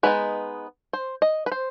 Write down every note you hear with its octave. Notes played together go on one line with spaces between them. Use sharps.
G#3 B3 D#4 B4
C5
D#5
B4
C5